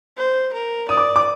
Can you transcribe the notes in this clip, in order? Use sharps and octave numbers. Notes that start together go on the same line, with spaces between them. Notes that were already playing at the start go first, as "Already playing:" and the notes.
C5
A#4
D5 D#6
D6
D6